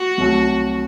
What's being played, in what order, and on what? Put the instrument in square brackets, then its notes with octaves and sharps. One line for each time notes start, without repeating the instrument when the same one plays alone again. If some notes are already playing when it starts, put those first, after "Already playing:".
Already playing: [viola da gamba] F#4
[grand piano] C2 C3 F#3 A3